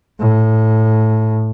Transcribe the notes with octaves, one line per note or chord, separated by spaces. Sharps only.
A2